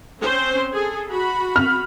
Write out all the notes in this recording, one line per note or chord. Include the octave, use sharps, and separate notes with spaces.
C4 C#4 C5
G#4 A4
F#4 B5
F6